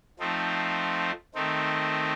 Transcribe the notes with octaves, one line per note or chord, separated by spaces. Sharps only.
F3 A3 C4 D#4
D#3 A3 C4 D#4